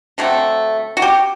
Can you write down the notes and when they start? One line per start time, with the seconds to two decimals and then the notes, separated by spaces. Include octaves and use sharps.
0.18 D3 F#3 A3 C4
0.97 F#4
1.02 G4